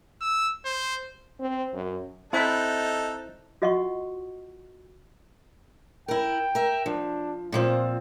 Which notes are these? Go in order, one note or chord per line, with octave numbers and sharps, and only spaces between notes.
E6
C5
C4
F#2
C4 D#4 E4 A4 C5 F#6
F4 F#4 D#5 F#5 C6 C#6
E4 A#4 G5
A#4 E5
F3 D4
A#2 F3 C4 F4